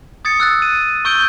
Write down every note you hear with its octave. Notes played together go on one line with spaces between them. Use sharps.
D#6 G#6 A6 C#7
E6 F#6 A6
D#7
C#6 E6 G6 D7 G7